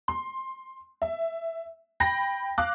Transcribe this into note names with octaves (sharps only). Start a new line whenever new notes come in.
C6
E5
G5 B5 A#6
F5 D6 F#6